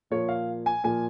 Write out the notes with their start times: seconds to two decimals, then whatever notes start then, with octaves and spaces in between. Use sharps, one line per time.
0.10 A#2 F3 A#3 C#5
0.29 F5
0.66 G#5
0.83 A#2 F3 A#3 G#5